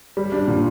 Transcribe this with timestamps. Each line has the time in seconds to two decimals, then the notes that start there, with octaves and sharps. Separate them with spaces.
0.17 G3
0.32 D4
0.48 A#2